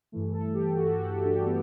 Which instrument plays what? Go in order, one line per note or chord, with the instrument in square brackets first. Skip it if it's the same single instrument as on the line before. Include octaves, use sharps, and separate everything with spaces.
[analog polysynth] G2 E3 A3
A4
G4
F#4
F#4
D4
B3